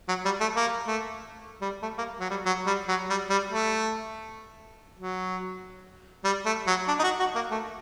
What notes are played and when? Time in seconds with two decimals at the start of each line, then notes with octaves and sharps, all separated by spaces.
0.08 F#3
0.25 G3
0.40 A3
0.56 A#3
0.87 A3
1.62 G3
1.82 A3
1.98 A#3
2.20 F#3
2.30 G3
2.46 F#3
2.66 G3
2.88 F#3
3.09 G3
3.30 G3
3.51 A3
4.99 F#3
6.24 G3
6.45 A3
6.67 F#3
6.88 D4
6.99 D#4
7.04 F#4
7.19 F#4
7.35 A#3
7.51 A3